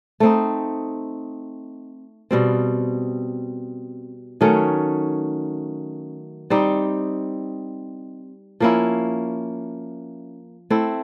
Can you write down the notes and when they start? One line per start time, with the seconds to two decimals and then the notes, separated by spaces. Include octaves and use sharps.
0.20 A3 C4 D#4
2.31 B2 G3 C4
4.41 D#3 F#3 A3 C#4
6.50 G3 C4 D#4 G4
8.60 F3 A#3 C#4 E4
10.70 A3 C4 E4